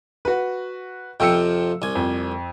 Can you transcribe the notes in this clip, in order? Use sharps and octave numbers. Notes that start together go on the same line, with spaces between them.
F#4 B4
F2 C3 F3 G5 E6 C#7
C2 G#5
F2